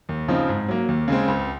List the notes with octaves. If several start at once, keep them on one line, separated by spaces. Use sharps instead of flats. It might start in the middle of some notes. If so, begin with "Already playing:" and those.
D#2
C#3 F3 C4 D#4
G#2
F#3 A#3
D#2
C#3 G#3 C4
C#2